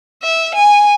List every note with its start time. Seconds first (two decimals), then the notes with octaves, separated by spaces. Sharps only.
0.22 E5
0.54 G#5